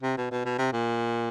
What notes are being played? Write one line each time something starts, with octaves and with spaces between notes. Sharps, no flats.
C3
B2
B2
B2
C3
A#2